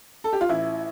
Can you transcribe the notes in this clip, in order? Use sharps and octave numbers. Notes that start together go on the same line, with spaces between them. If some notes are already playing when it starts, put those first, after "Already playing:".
A4
G4
F4
A1 E4